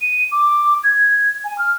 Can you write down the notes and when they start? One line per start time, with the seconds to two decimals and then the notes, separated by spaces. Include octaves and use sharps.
0.01 D#7
0.32 D6
0.84 G#6
1.44 G#5
1.58 F6